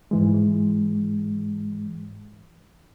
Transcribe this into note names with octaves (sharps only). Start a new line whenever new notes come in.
G#2 E3 G#3